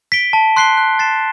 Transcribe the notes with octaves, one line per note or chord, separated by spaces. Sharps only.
B6 D7 G7
A5
C6 F#6 C7 G7
F#6
A6 C7 E7